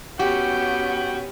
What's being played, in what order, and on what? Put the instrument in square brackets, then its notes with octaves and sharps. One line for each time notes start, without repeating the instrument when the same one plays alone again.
[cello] B3 C#4 [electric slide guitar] F#4 [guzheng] G4 [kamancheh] G5